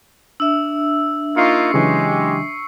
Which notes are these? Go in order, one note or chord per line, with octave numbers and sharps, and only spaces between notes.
D4 E5 E6
A#3 D#4 F4 C#6 C7 C#7
C#3 E3 F#3 G#3 G4